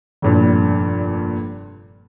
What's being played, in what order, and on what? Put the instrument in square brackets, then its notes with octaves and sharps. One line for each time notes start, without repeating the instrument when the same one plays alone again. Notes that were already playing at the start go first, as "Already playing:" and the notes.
[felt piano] F1 G2 A#2